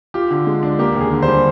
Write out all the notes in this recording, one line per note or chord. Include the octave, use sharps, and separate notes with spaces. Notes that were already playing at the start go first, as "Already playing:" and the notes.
F4 G4
D3
G#3
D4
A#3 G4
D#2
G#4
D3
C5
G3